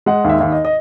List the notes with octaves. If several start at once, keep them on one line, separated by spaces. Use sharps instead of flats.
G#3 F#5
D#2
E5
D#2
D#5
D#5